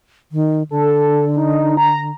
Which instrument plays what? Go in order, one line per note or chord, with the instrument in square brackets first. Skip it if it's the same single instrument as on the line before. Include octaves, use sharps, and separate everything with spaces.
[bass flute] D#3
[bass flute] D3 [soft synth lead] A4
[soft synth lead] D#4
A#5